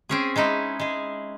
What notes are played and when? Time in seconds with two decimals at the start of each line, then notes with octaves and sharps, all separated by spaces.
0.09 C4 C#4 G#4
0.36 G#3 C#4 D#4 E4
0.79 G#3 G#4